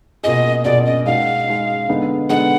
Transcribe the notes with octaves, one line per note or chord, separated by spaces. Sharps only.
B2 A#3 F4 G#4 D#5
B2 A#3 F4 G#4 D5
D#5
G#3 D#4 F#4 F5
G#3 D#4 F#4
D3 G#3 B3 D#4
D3 G#3 B3 D#4 F#5